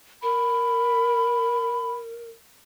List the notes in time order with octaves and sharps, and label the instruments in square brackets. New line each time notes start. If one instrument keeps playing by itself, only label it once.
[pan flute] A#4 [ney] B5